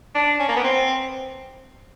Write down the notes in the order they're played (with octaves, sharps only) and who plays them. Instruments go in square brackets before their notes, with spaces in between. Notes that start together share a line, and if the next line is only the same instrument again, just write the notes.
[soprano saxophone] D4
C#4
A#3
B3
C4